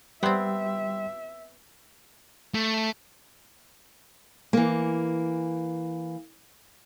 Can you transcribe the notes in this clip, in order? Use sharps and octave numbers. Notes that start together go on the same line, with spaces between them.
G3 B3 C4 E5 G5 C6
A3
E3 A#3